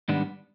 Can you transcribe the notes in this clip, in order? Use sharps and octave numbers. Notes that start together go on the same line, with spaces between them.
G#2 D#3 G3 B3 D4